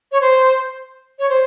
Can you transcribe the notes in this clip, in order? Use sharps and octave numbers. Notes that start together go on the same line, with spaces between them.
C#5
C5
C#5
C5